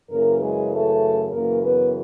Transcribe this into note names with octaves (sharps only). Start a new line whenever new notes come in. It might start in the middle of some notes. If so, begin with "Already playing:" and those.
F#2 C#3 E3 A#3 A#4
G#3 G#4
A3 A4
F#2 C#3 E3 A#3 A#4
B3 B4